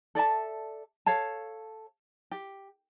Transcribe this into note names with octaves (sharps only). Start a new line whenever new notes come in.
A4 D5 E5 A5
A4 C#5 F5 A5
G4